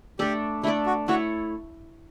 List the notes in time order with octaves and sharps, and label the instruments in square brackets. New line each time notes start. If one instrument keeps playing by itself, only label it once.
[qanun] A3 D4 A4 D5 [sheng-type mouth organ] G4
[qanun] A3 D4 A4 D5 [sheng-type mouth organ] E4
[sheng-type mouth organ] F#4
[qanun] A3 E4 A4 C#5 [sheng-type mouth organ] F#4